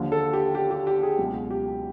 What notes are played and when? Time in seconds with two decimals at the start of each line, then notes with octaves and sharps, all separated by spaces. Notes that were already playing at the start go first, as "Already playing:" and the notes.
Already playing: D#2 D3 F3
0.12 A4
0.33 G4
0.55 G4
0.71 G4
0.87 G4
1.03 G#4
1.19 C#2 B2 F#3
1.51 G4